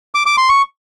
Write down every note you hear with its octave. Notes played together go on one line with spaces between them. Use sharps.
D6
D6
C6
C#6